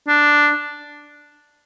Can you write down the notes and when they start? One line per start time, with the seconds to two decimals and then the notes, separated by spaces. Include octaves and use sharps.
0.08 D4